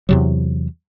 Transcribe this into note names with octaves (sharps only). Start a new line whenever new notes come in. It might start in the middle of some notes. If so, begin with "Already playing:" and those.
E2 C3 F#3